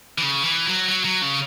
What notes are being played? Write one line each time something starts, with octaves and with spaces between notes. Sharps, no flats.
E3
C#3
E3
F#3
F#3
F#3
C#3